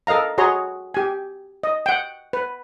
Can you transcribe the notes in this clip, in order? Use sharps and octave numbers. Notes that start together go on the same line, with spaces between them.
A4 A#4 D#5 F5 A#5
F#4 G#4 C#5 A#5 C6
G4 G#5
D#5
F#5 G5
B4